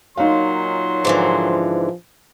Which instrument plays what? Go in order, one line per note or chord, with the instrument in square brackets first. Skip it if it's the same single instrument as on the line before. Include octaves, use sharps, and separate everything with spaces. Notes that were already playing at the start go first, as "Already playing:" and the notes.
[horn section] A#2 F#3 C6 [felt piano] D#4 F5
[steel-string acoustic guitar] G#2 D3 E3 [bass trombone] F3